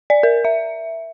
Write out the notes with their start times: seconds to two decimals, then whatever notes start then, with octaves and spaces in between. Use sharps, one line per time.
0.10 D5
0.23 A#4
0.45 E5